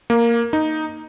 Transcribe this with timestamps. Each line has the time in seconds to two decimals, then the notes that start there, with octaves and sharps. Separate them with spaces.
0.10 A#3
0.53 D#4